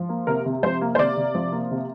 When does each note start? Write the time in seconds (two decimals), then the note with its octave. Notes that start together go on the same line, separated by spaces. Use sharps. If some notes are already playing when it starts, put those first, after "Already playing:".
Already playing: F3
0.09 A#3
0.27 C3 A#4
0.46 C3
0.63 F3 C5
0.81 A#3
0.95 C5
0.99 C3 D5
1.17 C3
1.35 F3
1.52 A#3
1.71 C3